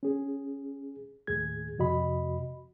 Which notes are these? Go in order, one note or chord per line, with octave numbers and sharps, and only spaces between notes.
C#4 G#4
D#2 A2 G#4 G#6
F2 C3 F#4 D#5 B5